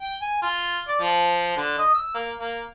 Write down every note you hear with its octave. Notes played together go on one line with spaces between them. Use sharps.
G5
G#5
F4
D5
F3
D3
D#5
E6
A#3
A#3